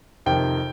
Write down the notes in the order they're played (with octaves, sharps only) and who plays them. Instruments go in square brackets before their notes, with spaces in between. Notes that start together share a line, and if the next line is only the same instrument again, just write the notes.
[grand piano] F2 C3 D#3 G5